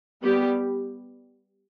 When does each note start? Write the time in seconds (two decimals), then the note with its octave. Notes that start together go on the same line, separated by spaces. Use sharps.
0.24 G3 B3 G4